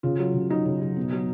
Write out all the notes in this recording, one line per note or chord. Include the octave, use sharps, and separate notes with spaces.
C#3 F4
F#3
C#3
F#3 D#4
C#3
F#3
B2
F#3